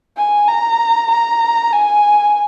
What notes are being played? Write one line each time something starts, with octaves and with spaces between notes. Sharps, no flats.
G#5
A#5
A#5
G#5